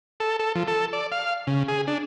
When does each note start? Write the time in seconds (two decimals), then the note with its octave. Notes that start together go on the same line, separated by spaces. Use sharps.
0.20 A4
0.39 A4
0.55 F3
0.68 A4
0.93 D5
1.12 F5
1.47 C#3
1.68 G#4
1.87 D4